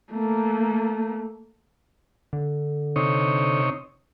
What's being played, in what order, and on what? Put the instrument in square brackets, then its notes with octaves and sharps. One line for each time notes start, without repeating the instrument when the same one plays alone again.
[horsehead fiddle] A3 A#3
[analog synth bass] D3
[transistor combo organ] C3 D#4 C#5